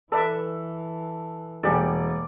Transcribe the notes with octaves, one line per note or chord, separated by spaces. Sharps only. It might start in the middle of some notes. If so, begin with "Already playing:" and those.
E3 A4 B4 D5 E5
E1 B2 G3 A#3 G4 A4 D5 G#5